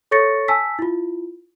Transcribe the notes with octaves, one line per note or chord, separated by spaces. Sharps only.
A4 C#5 C#6 A6 A#6 C#7
G#5 A5 E6 B6
E4 F4